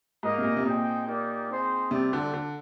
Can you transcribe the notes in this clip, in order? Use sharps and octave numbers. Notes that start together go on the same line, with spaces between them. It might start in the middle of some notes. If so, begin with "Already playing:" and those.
G#2 A#3 D#4 A#4 D#5
C3
A#2
C3
A#2 C4 D#4 G#4 D#5 G5
A#3 D#4 G4 A#4 D5
C4 D#4 G#4 C5
C3 G3 C4 G4 D5
D3
D3